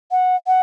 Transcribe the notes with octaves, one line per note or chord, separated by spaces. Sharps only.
F#5
F#5